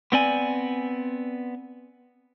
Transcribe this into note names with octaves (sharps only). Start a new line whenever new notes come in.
B3 C4 D5 G#5